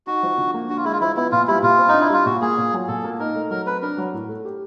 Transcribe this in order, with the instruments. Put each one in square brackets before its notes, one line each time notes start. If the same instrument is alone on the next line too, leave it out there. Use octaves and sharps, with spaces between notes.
[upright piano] D#4 [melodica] F#4
[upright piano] F3
D3
A#3
[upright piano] D4 [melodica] F#4
[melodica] F4
[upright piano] G#3 [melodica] E4
[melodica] F4
[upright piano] F3 [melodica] E4
[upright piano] B3 [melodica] E4
[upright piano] A#2 [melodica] F4
[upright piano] G3 [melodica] E4
[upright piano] A#2 [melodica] F4
[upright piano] C4
[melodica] D#4
[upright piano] D4
[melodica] E4
[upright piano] G3 [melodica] F4
[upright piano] A#2 [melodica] F#4
[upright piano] A#3 [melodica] G#4
[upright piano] A#2
F#3
[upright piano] A#2 [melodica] A4
[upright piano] A#3
[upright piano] D#4 [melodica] A#4
[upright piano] A3
[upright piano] F#3 [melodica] A#4
[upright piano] C4 [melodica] B4
[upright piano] D4 [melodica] A#4
[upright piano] F#3
A2
A3
G4